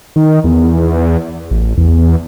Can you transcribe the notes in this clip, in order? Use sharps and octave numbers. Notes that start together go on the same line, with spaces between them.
D#3
E2
A1
E2